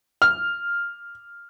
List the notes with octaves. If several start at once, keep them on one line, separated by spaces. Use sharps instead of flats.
F6